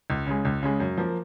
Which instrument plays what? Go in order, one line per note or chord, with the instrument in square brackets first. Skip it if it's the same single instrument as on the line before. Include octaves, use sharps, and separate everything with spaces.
[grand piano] C#2
C#3 G#3
C#2
C#3 G#3
F#2
F3 A#3